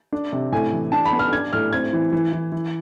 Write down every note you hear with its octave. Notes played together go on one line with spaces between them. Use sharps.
D4
C3
A2 G#5
E3
D4 A5
B5
B3
F6
D4 G#6
A2 F6
C4 G#6
E3
E3
E3
E3